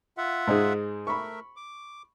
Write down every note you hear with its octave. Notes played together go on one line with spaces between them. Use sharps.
F4 E5 F#5
G#2 D#4 G#4
A3 A#4 E5 B5 C#6
D6